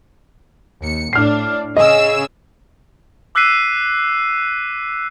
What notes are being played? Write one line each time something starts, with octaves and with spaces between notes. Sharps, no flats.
D#2 C#7
A2 D4 F6 C7
C#3 G#4 D#5 E6
D6 E6 F#6 B6 C7 D#7